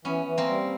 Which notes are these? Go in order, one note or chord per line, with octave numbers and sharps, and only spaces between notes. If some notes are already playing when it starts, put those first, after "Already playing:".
E3 B3 C#4
E3
A#3 C4
G3